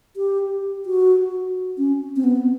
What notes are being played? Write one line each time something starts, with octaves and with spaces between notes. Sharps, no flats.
G4
F#4
C#4
C4
B3